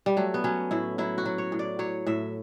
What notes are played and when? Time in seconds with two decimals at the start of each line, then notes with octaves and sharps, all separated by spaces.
0.06 G3
0.17 F#3 A3
0.34 B3
0.44 F#3 C#4
0.71 A2 E4
0.98 F#3 E4
1.18 F#4
1.26 F#3
1.38 C#5
1.52 A2
1.59 D5
1.79 F#3 C#5
2.07 A2 E5